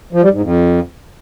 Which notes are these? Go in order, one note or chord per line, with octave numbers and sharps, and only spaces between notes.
F3
G3
G#2
F2